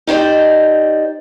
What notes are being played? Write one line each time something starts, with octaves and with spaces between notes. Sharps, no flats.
D#4 G4 C5 D5 D#5